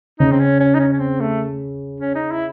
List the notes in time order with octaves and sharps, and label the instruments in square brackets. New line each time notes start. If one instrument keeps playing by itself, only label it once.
[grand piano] C#3 [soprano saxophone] D#4
[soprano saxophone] C4
C#4
C#4
D#4
C#4
C#4
C4
A3
C#4
D#4
E4